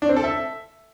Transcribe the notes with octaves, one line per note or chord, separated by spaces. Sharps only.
D4
C4
A4
E5